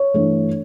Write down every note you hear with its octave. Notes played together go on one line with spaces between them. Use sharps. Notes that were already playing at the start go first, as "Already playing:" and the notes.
Already playing: C#5
G2 E3 A3